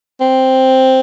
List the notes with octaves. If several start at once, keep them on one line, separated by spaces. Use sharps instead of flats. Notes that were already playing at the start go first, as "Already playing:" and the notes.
C4